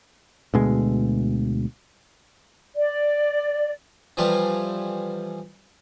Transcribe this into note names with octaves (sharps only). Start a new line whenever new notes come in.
D2 B2 G#3
D5
E3 F3 G3 F4 A4